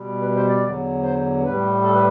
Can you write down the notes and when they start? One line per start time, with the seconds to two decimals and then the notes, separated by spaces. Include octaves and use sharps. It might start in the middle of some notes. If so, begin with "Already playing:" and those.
Already playing: B2 G3
0.22 B4
0.36 C5
0.49 D5
0.63 E2 D3 F#3
1.02 C5
1.43 A2 G3 B4
1.83 A4
1.94 B4